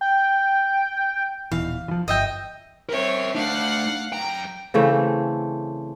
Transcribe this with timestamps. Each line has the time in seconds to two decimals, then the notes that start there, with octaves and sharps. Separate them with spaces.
0.01 G5
1.52 D#1 B2 E3 F5
1.88 E3 F3
2.08 G1 D#5 E5 G5
2.89 C4 A#4 C#5 E5
3.35 A3 D4 F5 F#5
4.12 F#2 G5 A#5
4.74 C#3 E3 A3 C4